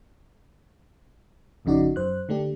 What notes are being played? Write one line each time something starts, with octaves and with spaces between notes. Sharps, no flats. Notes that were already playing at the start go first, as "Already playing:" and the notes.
G#1 F2 C#3 D#4 F#4 D5
F#2 C5 F#6
D3 A3 D4 G4